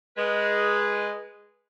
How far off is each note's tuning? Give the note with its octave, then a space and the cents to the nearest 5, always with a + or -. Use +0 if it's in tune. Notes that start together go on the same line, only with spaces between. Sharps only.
G#3 -5 B4 -20